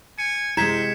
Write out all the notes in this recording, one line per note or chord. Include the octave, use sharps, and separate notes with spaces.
G#5 C#7
C3 G#3 E4 C5 A#5 G#6 B6 E7